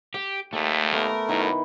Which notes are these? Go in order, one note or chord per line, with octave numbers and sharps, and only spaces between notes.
G4 G5
D#2 A3
A3 B3 A#4
F#2 D#3 E4 B4